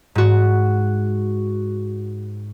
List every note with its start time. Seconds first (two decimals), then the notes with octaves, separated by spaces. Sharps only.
0.15 G#2 F#4